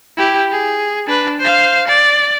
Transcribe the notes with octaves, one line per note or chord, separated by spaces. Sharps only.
E4 G4
G#4
D4 B4
C5 F5
D5